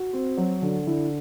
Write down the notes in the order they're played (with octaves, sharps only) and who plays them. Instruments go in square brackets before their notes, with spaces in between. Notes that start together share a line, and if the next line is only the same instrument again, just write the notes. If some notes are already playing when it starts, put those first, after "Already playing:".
Already playing: [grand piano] F#4
C4
F#3
D3
D3 E4